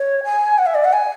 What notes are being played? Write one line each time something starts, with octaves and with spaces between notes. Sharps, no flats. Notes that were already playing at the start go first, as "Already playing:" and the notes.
Already playing: C#5
G#5
F#5
E5
D5
F#5
G#5